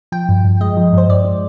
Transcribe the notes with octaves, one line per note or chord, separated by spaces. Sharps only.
F3 G5
G2
G2
G#3 D#5
F3
G2 C5
G2 D5
G#3